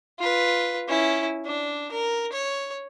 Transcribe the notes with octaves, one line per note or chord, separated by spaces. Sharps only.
F4 B4
C#4 E4
D4
A#4
C#5